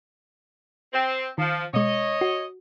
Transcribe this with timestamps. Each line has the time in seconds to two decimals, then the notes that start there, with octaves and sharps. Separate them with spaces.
0.93 C4
1.38 D#3 F3
1.74 B2 G#3 C#5 D#5
2.21 F#4